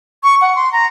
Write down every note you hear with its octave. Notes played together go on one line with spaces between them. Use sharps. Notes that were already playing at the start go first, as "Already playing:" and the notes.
C#6
F#5
C6
A#5